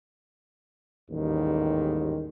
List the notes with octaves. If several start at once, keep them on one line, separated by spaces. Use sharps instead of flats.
A1 D#2 G#2 D#3 G3